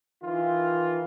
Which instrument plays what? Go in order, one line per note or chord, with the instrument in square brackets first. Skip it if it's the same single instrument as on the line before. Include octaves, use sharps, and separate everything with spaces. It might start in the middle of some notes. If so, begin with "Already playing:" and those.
[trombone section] D#3 E3 F4